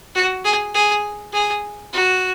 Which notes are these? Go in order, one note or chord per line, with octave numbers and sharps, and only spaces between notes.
F#4
G#4
G#4
G#4
F#4